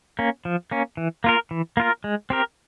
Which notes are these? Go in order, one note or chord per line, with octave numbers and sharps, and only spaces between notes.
A#3 C#4
F3
A#3 C#4
E3
A#3 F4 A#4
E3
A#3 F4 A#4
G#3
C4 G4 A#4